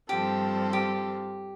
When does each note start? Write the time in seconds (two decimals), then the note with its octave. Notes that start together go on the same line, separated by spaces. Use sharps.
0.09 G2 F3 C4 G4 A4
0.73 G4